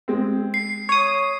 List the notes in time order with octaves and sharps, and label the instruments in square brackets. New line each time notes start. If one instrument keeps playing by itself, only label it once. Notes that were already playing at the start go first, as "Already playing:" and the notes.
[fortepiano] G#3 C4
[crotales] C7
[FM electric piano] C#5 D#6